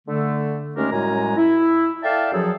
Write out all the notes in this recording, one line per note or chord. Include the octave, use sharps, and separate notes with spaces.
D3 A3
D#2 G#3 A3 C#4 D4 A#4
F#2 A2 G3 G#3 G#5 A#5
E4
A4 D5 E5 F5 G5 A5
F#2 F3 F#3 G#4 A4 E6